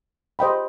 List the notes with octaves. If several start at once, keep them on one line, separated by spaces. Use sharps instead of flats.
G4 C5 D#5 G5 B5